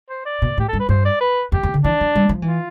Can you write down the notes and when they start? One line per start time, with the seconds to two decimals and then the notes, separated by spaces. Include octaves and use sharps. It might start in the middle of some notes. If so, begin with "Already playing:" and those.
0.09 C5
0.25 D5
0.42 B2
0.58 A2 G4
0.68 G2 A4
0.79 B4
0.89 G2 C5
1.05 D5
1.20 B4
1.52 F2 G4
1.63 F2
1.74 D3
1.84 E3 D4
2.01 F3
2.15 G3
2.29 F3
2.42 E3
2.48 F4